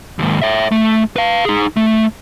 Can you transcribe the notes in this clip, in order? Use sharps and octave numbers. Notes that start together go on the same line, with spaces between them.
D#2 G#2
C#5 E5
A3
B4 F5
D#4 G#4
A3